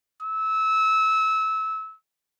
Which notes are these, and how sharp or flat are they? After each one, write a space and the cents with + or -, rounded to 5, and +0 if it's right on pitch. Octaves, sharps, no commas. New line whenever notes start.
E6 -25